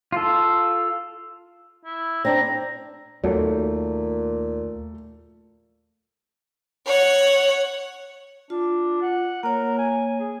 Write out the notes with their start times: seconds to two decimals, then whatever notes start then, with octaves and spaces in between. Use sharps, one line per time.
0.12 F4 A4
1.85 E4
2.25 C4 D4 A#5
3.24 D#2 A#2 F#3 A3
6.86 C#5 F#5
8.50 D4 F4
9.02 F#5
9.43 A#3 A#4 C#5
9.78 G#5
10.20 G#4